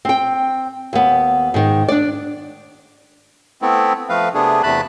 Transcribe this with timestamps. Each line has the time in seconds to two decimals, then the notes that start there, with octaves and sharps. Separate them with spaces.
0.05 C4 G5
0.93 D#2 B3
1.54 G#2 D#3
1.89 D4 D5
3.62 A3 B3 C4 E4
4.09 F3 A3 B4 F5
4.34 C3 A3 B3 D4 G#4
4.63 E2 C3 A3 A5 B5 F#6